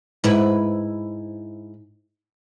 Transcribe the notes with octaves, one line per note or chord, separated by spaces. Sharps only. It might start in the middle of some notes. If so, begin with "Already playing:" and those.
G#2 E4 B4